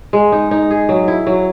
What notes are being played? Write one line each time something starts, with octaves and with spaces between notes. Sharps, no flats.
G#3
D#4
D#4
G#4
F#3
E4
F#3